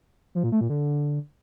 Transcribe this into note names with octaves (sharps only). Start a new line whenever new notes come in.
F3
A#2
A3
A#2
D3